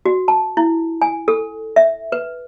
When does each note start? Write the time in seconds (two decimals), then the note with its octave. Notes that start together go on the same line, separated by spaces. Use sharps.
0.06 F#4
0.28 A5
0.57 E4
1.02 G#5
1.28 A4
1.76 E5
2.12 B4